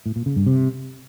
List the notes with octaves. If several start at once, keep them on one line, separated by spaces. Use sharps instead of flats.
A2
A#2
C#3
G2
C3